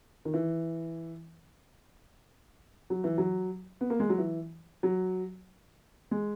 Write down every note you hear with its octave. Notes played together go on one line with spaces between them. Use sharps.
D#3
E3
F#3
E3
F#3
B3
A#3
G#3
F#3
E3
F#3
G#3